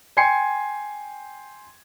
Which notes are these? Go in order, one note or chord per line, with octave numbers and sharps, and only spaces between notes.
G5 G#5 C6 G#6 C7 C#7